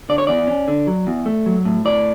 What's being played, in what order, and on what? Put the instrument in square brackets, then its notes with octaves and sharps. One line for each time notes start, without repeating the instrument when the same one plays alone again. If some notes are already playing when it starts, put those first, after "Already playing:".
[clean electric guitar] D3 D5
C#5
E2 D5
C#4
D3
F#3
E2
A3
F#3
A2
A2 D5